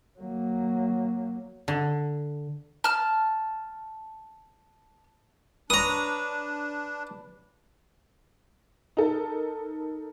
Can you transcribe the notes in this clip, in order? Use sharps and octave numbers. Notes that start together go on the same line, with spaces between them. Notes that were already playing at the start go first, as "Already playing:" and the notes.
F#3 A#3
D3
A5 F6
D4 B4 C#5 A#5 D#6
D#4 A4 A#4